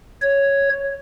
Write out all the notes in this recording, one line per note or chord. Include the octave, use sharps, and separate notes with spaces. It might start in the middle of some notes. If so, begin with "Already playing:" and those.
C#5